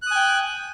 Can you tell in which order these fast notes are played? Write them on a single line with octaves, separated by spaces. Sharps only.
F#6 D#6 G#5 G5